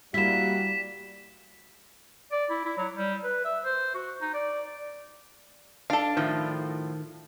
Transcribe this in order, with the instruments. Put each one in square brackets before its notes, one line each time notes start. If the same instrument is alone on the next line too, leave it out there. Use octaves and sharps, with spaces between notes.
[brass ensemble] G3 [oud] A#3 E4 [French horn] F#4 [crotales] B6 E7
[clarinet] D5
E4
E4
F#3
G3
B4
E5
C5
F#4
D#4
D5
[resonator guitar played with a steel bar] D4 [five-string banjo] A4 F5
[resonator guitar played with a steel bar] A2 F3 [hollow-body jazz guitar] D#3